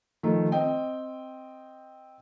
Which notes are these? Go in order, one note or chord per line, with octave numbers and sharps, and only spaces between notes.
D#3 F3 A3
C4 D#5 G5